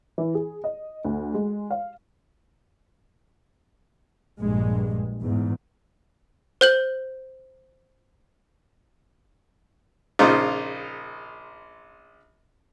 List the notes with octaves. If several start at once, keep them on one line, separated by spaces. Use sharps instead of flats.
E3
G#4
D#5
D2
G#3
F5
A#1 G2 G#3
E2 G#2
C5 G6 F#7
A#1 C#3 D#4 F4 C5